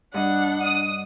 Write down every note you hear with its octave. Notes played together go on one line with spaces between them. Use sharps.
G2 D4 D#5 F#5
D#6